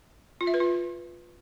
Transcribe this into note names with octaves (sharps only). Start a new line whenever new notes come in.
F4
E5
B4
F4